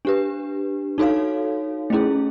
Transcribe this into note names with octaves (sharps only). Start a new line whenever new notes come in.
D4 G4 B4
D#4 F#4 A4 C#5 F5
A3 C#4 E4 G#4